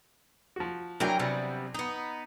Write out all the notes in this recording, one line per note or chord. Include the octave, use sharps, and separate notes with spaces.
F3 F#4
E3 F#3 D4 A#4 G5
C3 G3 B3
B3 D#4